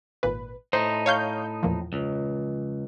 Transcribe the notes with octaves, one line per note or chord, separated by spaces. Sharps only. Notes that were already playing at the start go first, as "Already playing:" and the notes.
G#1 A#2 B4
A2 D#4 C5
C#5 F5 G6
E2 A#2 F3
C#2